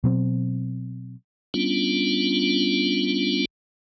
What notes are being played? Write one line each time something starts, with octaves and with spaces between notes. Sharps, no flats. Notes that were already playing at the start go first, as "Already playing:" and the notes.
B2 F#3 C4
G3 B3 C#4 D4 F4